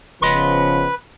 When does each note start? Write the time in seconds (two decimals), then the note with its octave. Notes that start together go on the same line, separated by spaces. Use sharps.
0.22 D#1 C#3 F3 B3 B4 D#5 C6